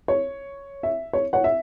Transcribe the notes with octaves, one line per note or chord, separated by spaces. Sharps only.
C#5
E5
C#5
C#5 F#5
E5